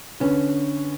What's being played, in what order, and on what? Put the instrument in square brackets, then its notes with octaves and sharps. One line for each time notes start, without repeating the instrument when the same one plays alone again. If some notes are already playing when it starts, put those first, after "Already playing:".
[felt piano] D3 C#4 B4